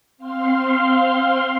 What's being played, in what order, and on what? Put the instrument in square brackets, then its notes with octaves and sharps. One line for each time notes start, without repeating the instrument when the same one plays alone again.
[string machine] C4 F5 C6